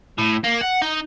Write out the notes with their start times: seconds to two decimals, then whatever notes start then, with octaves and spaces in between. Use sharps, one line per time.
0.18 A2
0.44 A#3
0.61 F#5
0.82 D#4